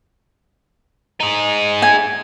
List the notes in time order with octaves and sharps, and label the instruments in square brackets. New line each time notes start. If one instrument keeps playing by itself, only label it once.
[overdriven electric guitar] D#4 G#4
[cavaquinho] G#5